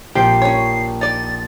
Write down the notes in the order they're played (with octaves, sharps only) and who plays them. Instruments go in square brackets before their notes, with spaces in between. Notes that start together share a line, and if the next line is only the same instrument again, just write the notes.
[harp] A#1 [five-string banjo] C4 [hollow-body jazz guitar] G4 [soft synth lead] C7
[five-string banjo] C#4 C#5
[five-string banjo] D#4 D5 [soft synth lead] A6